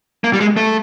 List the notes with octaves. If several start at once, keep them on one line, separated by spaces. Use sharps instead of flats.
A#3
G3
G#3
A3